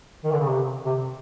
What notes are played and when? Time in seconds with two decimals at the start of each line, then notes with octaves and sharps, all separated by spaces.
0.24 D#3
0.32 D3
0.40 C#3
0.49 C3
0.85 C3